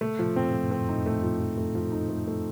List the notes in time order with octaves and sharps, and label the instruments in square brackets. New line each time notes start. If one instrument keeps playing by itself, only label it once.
[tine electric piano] A#2 C#3 [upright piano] A3
[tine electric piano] A2 C3 [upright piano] F3
[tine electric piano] F#2 A#2 [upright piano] C4
[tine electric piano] F2 A2 [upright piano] F3
[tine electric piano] A2
[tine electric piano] F#2 A#2 [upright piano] C4
[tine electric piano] F2 A2 [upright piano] D#4
[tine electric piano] F2 A2 [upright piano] A3
[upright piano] F3
F3
A3
F3
D#4
A3
A3